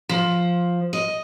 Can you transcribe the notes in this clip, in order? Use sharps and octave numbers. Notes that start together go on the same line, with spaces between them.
F3
D#5